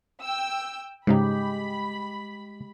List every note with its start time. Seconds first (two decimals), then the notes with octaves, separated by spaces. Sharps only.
0.22 G5 E6
1.07 G#2 C#3 G#3 D#4 G4 B5